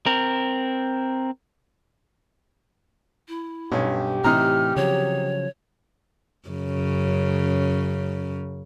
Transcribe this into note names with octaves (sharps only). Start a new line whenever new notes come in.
C4 A#4
E4
B1 G2 C#4 G4
A2 C3 E3 D#4 A#5 F6
C#3 F3 F#3 C#5
F#2 C#3